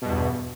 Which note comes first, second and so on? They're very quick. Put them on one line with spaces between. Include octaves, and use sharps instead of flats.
B2 G2 E2